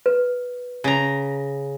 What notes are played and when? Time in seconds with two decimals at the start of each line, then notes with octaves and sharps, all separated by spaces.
0.06 B4
0.84 C#3 A#5